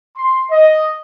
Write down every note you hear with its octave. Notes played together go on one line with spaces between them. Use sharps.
C6
D#5